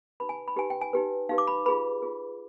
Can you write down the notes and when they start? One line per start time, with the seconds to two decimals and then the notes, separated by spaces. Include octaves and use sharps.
0.20 D#4 G4 B4 B5
0.29 G#5
0.48 B5
0.56 D#4 G4 B4 G#5
0.70 G5
0.81 G#5
0.93 D#4 G4 B4
1.29 D#4 G4 B4 F5
1.38 D6
1.47 B5
1.66 F4 G#4 B4 B5
2.02 F4 G#4 B4